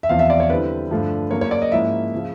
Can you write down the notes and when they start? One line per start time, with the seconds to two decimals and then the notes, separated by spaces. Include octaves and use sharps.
0.03 E5
0.09 E2 C3 F3 F5
0.19 E5
0.30 D5
0.40 C#5
0.50 D3 G3 C4 E4 B4
0.91 G2 D3 F3 A3
1.31 C#3 F#3 A#3 C#5
1.41 C#5
1.51 D5
1.62 D#5
1.72 G#2 F3 A#3 C#4 E4 E5
2.14 C#3 F3